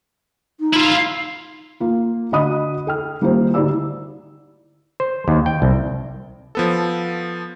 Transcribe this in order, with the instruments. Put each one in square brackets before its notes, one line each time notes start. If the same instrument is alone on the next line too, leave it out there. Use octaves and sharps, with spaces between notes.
[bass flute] D#4
[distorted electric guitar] E4 F4
[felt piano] A#3 F4
D2 D4 F#4 D#5 B5 D#6
A4 G5 F6
D#3 G3 A#3 E4 F4 C5
D2 D#4 E4 G4 D5 E6
[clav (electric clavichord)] C5
D#2
G5
C2
[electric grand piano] F3 B3 A4